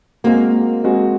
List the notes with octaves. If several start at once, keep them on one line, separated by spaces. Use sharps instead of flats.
G#3 A#3 C4 F#4
G#3 C4 F#4